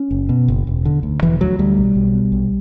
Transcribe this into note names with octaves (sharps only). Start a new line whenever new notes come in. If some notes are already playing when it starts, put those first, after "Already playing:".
Already playing: C#4
F#1
B2
F#1
E1
D3
D2
E1 E3
D2 F#3
D2 G3
B1
B1
B2
B1